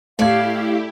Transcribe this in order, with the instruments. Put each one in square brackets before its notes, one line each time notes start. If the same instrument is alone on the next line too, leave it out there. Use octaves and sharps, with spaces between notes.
[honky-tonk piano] A2 G#6 [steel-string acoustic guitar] A3 D5 [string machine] E4 G4 [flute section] F5